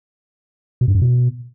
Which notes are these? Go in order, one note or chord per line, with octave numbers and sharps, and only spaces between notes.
B2
G2
F#2
B2